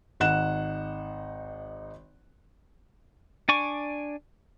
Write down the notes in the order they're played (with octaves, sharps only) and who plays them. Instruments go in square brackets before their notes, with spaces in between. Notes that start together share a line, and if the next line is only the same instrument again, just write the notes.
[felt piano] G#1 D#4 F#5 F#6 E7
[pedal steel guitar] D4 D5 G#5 C#6